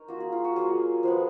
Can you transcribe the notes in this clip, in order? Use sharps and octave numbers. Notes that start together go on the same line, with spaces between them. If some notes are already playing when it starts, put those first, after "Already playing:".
Already playing: D#4 A#4 C#5
A#3 F4 F#4
G#4
F4
F#4
F#3 A#3 F4 G#4
F3 G#3 B3